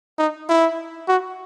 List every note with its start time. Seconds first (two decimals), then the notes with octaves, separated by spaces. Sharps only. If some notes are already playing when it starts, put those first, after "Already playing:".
0.19 D#4
0.49 E4
1.08 F#4